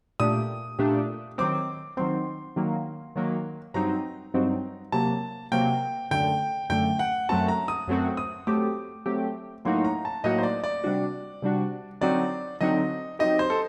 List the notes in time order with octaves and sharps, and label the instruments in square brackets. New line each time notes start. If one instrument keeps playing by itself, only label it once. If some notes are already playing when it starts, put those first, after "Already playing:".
[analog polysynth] A#2 A3 D4 G4 [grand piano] D#6
[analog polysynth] A#2 A3 D4 G4
[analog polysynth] D#3 F#3 C4 [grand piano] D6
[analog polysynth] D#3 F#3 C4 [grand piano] C6
[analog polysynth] D#3 F#3 A#3
D#3 F#3 A#3
[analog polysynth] G2 F#3 C4 D#4 [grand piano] A#5
[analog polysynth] G2 F#3 C4 D#4
[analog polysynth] C3 F#3 A#3 [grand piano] A5
[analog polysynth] C3 F#3 A#3 [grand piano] G5
[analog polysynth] F#2 D3 A3 [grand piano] G5
[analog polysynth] F#2 D3 A3 [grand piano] G5
[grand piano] F#5
[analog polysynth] F#2 F#3 A3 C4 F#4 [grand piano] A5
[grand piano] A#5
D#6
[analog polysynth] F#2 F#3 A3 C4 F#4
[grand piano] D#6
[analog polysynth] F#3 A3 C4 G4 [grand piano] D6
[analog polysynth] F#3 A3 C4 G4
[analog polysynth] A2 F#3 A#3 D#4 F#4 [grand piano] C6
[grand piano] A#5
A5
[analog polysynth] A2 F#3 A#3 D#4 F#4 [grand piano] D#5
[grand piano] C5
D5
D5
[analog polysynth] C3 G3 D4 F#4
C3 G3 D4 F#4
[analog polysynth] D3 F#3 C4 D#4 F#4 [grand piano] D5
[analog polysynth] D3 F#3 C4 D#4 F#4 [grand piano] D#5
[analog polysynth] F#3 C4 D#4 G4 [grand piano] D#5
[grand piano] C5
A4